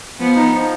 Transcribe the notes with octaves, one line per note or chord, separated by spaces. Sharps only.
F3 B3
D#4
F3